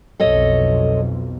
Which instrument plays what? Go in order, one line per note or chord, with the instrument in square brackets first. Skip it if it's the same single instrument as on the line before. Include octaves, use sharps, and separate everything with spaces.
[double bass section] B1 F2 [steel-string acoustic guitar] A4 C#5 D#5